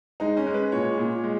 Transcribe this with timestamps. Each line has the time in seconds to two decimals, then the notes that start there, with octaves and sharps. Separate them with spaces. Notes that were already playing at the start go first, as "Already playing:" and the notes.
0.20 G#3 D#4
0.37 C#4
0.47 G#3
0.54 B4
0.72 A#2 C#5
0.98 A#2
1.23 G#3